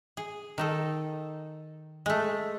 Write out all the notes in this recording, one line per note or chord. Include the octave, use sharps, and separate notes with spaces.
G#4
D#3 D#4 A4
G#3 A3